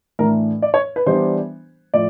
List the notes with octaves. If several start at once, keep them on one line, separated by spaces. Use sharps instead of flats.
A2 E3 A3 D4 A#4
D5
C#5
B4
E3 G3 B3 D4 C5
A2 F3 D5